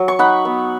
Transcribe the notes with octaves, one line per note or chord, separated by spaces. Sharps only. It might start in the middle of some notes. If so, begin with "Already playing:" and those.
Already playing: F#3
C#6
D#4 F#5 B5
B3